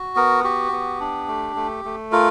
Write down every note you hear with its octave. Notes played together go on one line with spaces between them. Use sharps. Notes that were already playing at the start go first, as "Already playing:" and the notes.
Already playing: F#4
B3 A#4
F#4 G4
B3
D4
A3
A3
A3
F4 A#4